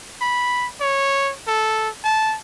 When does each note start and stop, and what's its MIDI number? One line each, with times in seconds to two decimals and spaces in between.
0.21 0.68 83
0.81 1.33 73
1.48 1.89 69
2.04 2.36 81